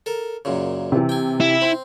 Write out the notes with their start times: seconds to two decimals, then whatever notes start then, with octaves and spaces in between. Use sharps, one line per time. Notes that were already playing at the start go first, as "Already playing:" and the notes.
0.06 A4 A#4
0.45 F#2 A#2 C#3
0.92 C3 E3
1.09 G5 G#5
1.40 E4
1.62 C4